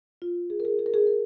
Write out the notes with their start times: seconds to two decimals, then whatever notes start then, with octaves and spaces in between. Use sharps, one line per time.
0.22 F4
0.50 G#4
0.60 A#4
0.65 G#4
0.79 G#4
0.86 A#4
0.94 G#4
1.07 A#4